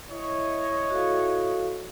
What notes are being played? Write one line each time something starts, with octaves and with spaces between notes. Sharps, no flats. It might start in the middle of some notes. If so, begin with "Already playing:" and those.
E4 C#5 D#5
F#4 A4 F5